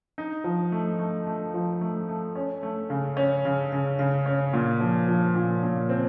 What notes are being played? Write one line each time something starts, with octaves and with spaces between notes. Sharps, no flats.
D#4
F3
A3
A3
A3
F3
A3
A3
C#4
A3
C#3
C#4
C#3
C#3
C#3
C#4
A#2
F3
F3
A#2
A#2
C4